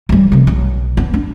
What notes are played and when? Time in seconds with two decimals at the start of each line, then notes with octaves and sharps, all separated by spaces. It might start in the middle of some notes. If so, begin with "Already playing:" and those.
0.09 E3 G3
0.32 C3 F3
0.47 B1
0.97 B3
1.14 D4